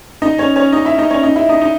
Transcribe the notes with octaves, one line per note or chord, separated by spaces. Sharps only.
D#4 D#5
C#4 C#5
C#4 C#5
D#4 D#5
E4 E5
D#4 D#5
C#4 C#5
D#4 D#5
E4 E5
D#4 D#5
D#4 D#5